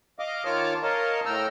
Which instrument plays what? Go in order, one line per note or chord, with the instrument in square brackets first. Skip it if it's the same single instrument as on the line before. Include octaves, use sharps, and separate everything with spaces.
[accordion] D#5 F5 D6
D#3 F4 C#5 A5 D6 F6
A#4 C#5 D#5 F5 A5
A2 G5 A#5 E6 F6